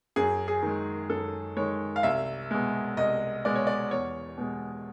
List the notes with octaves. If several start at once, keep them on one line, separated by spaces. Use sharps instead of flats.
F#2 G#4
G#4
D#3 G#3
F#2 A4
D#3 G#3 C#5
F5
C2 E5
B2 G#3
C2 D#5
B2 G#3 D5
C#5
D5
E2 C#5
B2 G#3